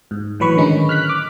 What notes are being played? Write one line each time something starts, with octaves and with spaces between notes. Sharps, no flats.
G#2
A2 E3 F#3 B4 B5 C#6
D3 D#3 G#3 C#4 D#4
F6 F#6 B6
D6